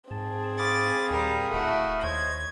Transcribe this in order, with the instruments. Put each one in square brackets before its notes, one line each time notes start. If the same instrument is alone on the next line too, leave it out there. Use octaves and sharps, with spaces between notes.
[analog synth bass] G#2 [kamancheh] C4 G#4 [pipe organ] A5
[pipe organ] F5 B5 D#6 [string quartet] D6 A6
[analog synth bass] D#2 [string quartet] A#2 G3 A#4
[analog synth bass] D1 [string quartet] A3 E4 F#4
[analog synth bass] D#2 [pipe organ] C5 C#5 D#5 [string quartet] G#6